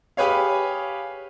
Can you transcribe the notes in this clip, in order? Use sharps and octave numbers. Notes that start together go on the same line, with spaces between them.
G4 G#4 B4 C#5 F5